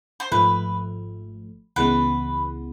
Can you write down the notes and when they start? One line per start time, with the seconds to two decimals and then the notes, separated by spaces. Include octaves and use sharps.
0.20 C5
0.31 G#1 G#2 F3 A3 B4
1.76 C#2 C#3 E3 G#3 B3 B4